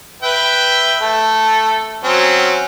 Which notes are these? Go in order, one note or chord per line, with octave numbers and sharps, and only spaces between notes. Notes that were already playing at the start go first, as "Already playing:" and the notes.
B4 E5 G5
A3 A4
F#3 C4 C#4